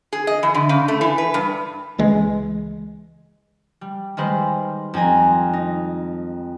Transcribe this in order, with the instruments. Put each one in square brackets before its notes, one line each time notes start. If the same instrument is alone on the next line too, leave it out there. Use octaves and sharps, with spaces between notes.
[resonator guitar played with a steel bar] G#4
D#5
E3
D3
C#3
A3
E3
B4
G2
[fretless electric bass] C#2 E3 G#3
[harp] G3
D#3 G3 G#3 B4 C5
F2 C4 G#5 A#5
D#4